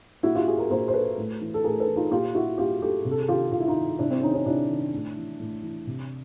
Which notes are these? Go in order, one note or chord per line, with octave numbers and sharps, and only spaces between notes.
A#2 E4 F#4
F4 G4
F#4 G#4
G#4 A#4
A#2 A#4 C5
C5
A4 B4
A2
E3
A4
A2 G#4 A#4
A4 B4
E3
D#4 F4
A#2 F4 G4
E4 F#4
A#2 F4 G4
G4 A4
C3
A4
G#4
D#3 F4 G4
C3 F4
E4
D#4 F4
D#3
C3 D4 E4
C4 D4
D#3 C#4 D#4
C#4 D#4
C3 D4 E4
D#3
A2
E3
A2
E3
C3